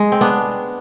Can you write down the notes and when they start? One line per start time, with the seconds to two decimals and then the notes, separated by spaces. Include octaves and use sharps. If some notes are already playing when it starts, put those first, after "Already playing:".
Already playing: G#3
0.12 C4
0.21 B3 D4